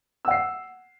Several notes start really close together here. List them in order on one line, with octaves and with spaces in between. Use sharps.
E6 F#5 C7